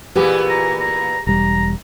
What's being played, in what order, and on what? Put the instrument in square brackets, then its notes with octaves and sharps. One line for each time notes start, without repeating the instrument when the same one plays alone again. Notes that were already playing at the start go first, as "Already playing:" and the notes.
[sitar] A#2 E3 B3 [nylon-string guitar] G4 G#4 G#5
[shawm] A#5
A#5
[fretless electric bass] E1 G3 [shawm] A#5